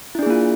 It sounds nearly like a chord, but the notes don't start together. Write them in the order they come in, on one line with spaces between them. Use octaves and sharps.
E4 D4 G#4 A#3 F4